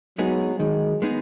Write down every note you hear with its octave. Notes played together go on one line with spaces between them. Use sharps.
F#3 G#3 B3 D#4 G#4
D#3 G#3
G#3 B3 D#4 G#4